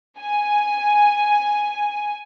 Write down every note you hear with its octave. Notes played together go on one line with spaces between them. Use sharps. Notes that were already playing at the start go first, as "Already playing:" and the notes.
G#5